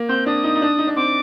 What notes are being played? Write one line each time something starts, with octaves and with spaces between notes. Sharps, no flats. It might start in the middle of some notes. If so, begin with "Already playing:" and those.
Already playing: A#3
C4 G6
D4 D#6
D#4
D#4
D4
D#4
D4
C4 D6